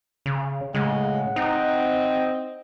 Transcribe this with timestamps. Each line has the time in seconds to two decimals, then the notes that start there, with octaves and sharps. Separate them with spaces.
0.26 C#3
0.75 A2 C#3 G#3 F#5
1.36 C4 D#4 D#5 G5